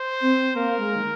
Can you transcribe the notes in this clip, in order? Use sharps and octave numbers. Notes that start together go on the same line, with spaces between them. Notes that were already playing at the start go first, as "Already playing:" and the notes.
Already playing: C5
C4
A#3 A#4
G#3
D#3